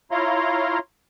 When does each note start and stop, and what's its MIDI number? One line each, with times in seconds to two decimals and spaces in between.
0.11 0.79 64
0.11 0.79 65
0.11 0.79 73
0.11 0.79 77
0.11 0.79 82
0.11 0.79 84